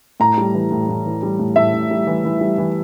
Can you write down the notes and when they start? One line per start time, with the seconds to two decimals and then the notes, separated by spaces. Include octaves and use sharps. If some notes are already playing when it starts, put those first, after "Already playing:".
0.20 A2 A#5
0.38 G3
0.54 E3
0.72 A2
0.89 A2
1.06 E3
1.23 G3
1.39 A2
1.56 A2 E5
1.73 A2
1.91 G3
2.07 E3
2.25 E3
2.41 G3
2.58 E3